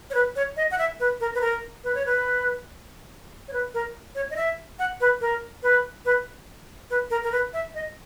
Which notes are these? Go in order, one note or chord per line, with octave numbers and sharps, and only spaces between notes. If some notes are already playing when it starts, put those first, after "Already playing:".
C#5
B4
C#5
D#5
F#5
E5
B4
A#4
B4
A#4
B4
C#5
B4
C#5
B4
A#4
C#5
D#5
E5
F#5
B4
A#4
B4
B4
B4
A#4
A#4
B4
E5
D#5